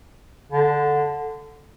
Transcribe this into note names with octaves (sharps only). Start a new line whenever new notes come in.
D3